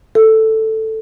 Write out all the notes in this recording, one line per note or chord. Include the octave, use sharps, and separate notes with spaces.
A4